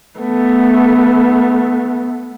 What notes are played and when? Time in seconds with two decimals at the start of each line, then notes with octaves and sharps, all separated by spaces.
0.19 A3 B3